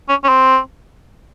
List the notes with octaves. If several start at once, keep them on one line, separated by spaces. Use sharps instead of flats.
C#4
C#4
C4